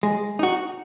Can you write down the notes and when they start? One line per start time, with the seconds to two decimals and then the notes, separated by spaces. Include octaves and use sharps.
0.03 G#3
0.39 D#4 F#4